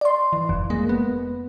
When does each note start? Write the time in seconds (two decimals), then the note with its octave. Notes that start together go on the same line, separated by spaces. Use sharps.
0.01 D5 C6
0.33 E3
0.49 F1 F2
0.70 G#3 A#3
0.89 B3